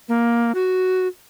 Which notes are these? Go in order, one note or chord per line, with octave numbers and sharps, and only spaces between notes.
A#3
F#4